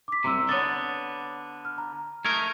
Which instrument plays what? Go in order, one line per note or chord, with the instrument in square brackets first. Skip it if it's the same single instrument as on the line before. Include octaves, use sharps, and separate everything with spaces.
[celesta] D6 B6
[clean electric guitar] C2 G#2 C3 [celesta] A#5 C6 E6
[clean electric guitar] D3 B3 [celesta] C#5 D#6 A6
[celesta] F6
A#5
[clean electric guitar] A3 D#4 A#4 [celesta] G#6